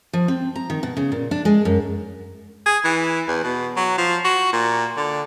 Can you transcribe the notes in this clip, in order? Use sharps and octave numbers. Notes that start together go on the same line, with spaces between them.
F3
C4
A#5
D#3
B2
C#3
A#2
D4
G#3
F#2
G#4
E3
E2
B2
F#3
F3
F#4
A#2
D3